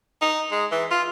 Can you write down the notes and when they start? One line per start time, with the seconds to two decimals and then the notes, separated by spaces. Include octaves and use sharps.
0.22 D#4
0.51 G#3
0.72 E3
0.91 F4